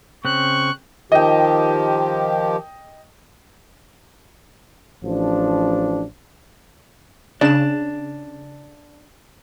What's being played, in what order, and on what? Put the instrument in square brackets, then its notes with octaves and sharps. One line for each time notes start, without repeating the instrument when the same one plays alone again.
[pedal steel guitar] C#3 C4 [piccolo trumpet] C#6 [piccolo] F#6
[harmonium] D#3 F3 G4 [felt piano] D#5 G5
[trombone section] A1 F3 D4
[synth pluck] C#3 E7 [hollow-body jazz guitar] D4